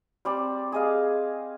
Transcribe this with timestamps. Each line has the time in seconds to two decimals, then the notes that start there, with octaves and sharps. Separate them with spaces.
0.25 G3 C4 D5
0.72 G#4 D#5 F5